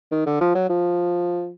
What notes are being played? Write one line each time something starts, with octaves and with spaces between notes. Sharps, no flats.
D#3
D3
F3
F#3
F3